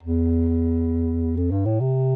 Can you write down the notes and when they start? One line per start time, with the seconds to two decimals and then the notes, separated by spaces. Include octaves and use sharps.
0.03 E2
1.37 F2
1.51 G2
1.66 A2
1.81 C3